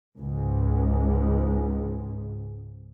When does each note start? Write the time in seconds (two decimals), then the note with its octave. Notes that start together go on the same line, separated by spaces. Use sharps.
0.17 C#2 G#2